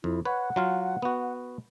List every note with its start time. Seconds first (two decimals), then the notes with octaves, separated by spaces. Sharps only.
0.04 F2 E4
0.25 B4 C#5 F#5
0.56 F#3 F4 F5
1.02 B3 F#4